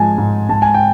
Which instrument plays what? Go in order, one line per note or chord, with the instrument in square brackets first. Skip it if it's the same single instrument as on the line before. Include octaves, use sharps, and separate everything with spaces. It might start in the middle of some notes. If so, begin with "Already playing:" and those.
Already playing: [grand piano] G#2 F3 G#3 G#5 A5
G#2
G#2 A5
G#5
G5